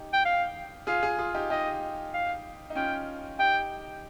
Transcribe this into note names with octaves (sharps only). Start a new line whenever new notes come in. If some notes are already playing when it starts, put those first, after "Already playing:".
Already playing: D#4 G4
G5
F5
F4 G#4 F5
F4 G#4
F4 G#4
D#4 G4
D#4 G4 D#5
F5
D#4
C#4 F4 G5
D#4 G4 G5